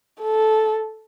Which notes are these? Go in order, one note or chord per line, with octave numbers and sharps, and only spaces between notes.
A4